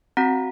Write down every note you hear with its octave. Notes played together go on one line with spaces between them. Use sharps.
C4 F#4 F#5 A#5